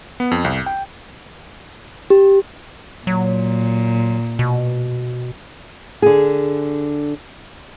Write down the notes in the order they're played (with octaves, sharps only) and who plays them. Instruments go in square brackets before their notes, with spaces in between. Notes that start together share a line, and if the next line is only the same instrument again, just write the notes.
[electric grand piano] B3
F2
C2
G5
[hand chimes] G4
[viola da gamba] A#2 [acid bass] F#3
[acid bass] B2
[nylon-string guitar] D3 G#4